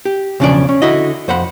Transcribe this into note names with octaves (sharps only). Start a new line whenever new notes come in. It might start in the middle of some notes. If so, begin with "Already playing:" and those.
G4
B1 E2 C#3 F3 D4 D5
C#4
D3 E4 F#4 D#5
F2 C5 F#5 B5